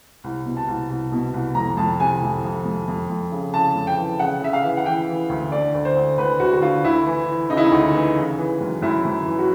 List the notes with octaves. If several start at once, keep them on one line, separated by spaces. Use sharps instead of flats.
C2
B2
A5
C2
C2
B2
C2
F2 A#5
F2 A5
C3 G#5
F2
F2
F2
F2
F2
C#3
C#3 A5
F2
G5
E3
C#3 F#5
C#3 E5
F5
E3
F#5
E3 G5
E3
D2
D3 D5
D2
C5
D2
D2 B4
D2 F#4
F#4
D3 F4
D2 E4
E3
E3
C#3 D#4
E4
D#4
D2
E3
C#3
E3
F#2
F#2 E4
F#2
E3
F#4